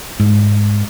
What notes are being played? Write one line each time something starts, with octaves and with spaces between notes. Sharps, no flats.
G#2